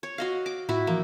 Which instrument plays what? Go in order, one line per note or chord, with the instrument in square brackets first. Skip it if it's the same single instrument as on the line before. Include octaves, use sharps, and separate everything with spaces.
[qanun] C#5
F#4 D#5 F5
D6
[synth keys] A2 [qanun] E4 F#4
[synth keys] E3 F3 [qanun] A#3